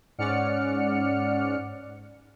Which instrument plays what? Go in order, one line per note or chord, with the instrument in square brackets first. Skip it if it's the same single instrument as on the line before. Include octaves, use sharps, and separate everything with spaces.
[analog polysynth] G#2 C#4 D5 F#5 F6 C#7